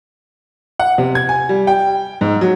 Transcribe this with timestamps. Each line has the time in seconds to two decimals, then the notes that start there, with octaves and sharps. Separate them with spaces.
0.79 F#5
0.98 C3
1.15 G#6
1.29 G#5
1.49 G3
1.67 G5
2.21 G#2
2.41 F#3